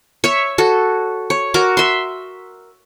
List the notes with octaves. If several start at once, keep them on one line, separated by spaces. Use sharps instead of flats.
C#5 E5
F#4 A4
C#5
F#4 A#4 D6
E5 C6